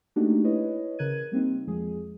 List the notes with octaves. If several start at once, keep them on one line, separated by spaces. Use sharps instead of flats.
A3 A#3 D4 D#4 F#4 G4
E4 B4 C#5 D#5
C#3 A#4 F#6 G#6 D#7
G3 A#3 C4 D#4
F2 F3 G#3 G#4